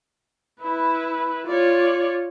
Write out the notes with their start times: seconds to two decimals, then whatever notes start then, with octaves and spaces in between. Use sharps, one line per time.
0.61 E4 B4
1.47 F4 C#5 D5